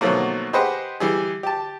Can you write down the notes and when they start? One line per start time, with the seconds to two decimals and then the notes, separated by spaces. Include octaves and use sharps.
0.01 B2 D#3 F3 F#3 A3 A#3
0.53 G4 G#4 B4 C5 D#5 F#5
1.00 E3 G3 G#4
1.43 G4 A5